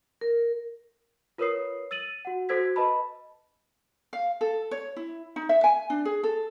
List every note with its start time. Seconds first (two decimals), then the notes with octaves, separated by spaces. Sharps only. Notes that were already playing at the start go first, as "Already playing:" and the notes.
0.21 A#4
1.38 F4 A#4 B4 C#5 D#6 C7
1.91 E6 A6 D#7 F#7
2.25 F#4 F#5
2.49 F#4 A4 C5 E6 G#6 B6
2.76 B4 D#5 A5 B5
4.13 F5
4.41 A4
4.71 C#5
4.96 E4
5.36 D#4
5.49 E5
5.64 G#5
5.90 D4
6.05 G#4
6.23 A4